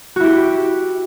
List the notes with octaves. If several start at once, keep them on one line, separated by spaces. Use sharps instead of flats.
E4 F#4 G4